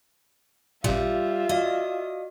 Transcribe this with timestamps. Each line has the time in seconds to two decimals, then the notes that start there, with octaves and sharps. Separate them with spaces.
0.84 A1 A#2 G3 F4 E5
1.49 F#4 D5 D#5 F5